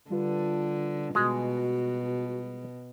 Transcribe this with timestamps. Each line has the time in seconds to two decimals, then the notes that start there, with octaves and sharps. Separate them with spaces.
0.10 D3 G3 F4 B4
1.15 B2 G#3 F#4